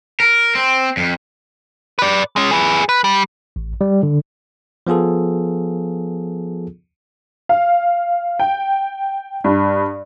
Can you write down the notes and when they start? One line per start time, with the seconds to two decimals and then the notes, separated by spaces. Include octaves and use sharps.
0.20 A#4
0.55 C4
0.97 F2
1.99 B4 D5
2.36 G#3 C#4
2.51 G#4 B4
2.89 B4
3.04 G3
3.56 A1
3.81 G3
4.03 D3
4.87 F3 B3 F4 G#4 A4
7.49 F5
8.39 G5
9.44 G2